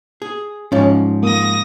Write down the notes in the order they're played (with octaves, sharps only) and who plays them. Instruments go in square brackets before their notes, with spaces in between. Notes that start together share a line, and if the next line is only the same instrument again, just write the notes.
[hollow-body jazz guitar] G#4
[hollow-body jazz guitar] G#2 F3 [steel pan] C#4
[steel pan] A#3 [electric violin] D#6 A#6